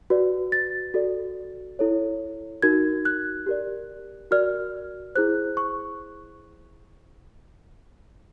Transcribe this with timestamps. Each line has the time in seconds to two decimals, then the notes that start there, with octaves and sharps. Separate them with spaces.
0.10 F#4 B4 D5
0.52 A6
0.94 F#4 A4 D5
1.79 E4 A4 C#5
2.62 D#4 F#4 A#4 G#6
3.05 F#6
3.46 G4 A#4 D5
4.31 F#4 A#4 D5 F6
5.15 E4 G#4 C5 F#6
5.57 C#6